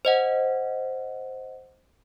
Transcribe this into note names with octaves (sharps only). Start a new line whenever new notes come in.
C5 D#5 F#5